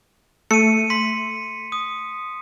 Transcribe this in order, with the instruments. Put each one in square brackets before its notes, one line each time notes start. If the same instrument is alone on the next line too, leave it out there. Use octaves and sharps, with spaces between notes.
[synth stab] A3 [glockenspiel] C#7 D#7
[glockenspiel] C6 B6
D#6